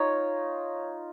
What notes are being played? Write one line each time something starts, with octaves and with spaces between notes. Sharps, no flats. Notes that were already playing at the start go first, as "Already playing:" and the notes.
Already playing: D#4 F4 C#5